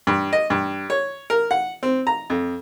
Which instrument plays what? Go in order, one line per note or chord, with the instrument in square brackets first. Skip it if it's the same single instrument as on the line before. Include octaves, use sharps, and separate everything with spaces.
[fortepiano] G2
D#5
G2
C#5
A#4
F#5
C4
A#5
F2